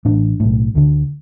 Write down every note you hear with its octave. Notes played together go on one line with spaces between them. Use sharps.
A1 A2 D4
B1 A2
D2 D3